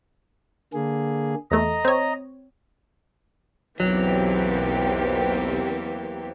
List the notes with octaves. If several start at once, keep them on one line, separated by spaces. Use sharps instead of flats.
D3 A#3 G#4
E2 A3 D#5 A#5
C4 C#5
B1 E2 E3 F#3 A#3 C4 G4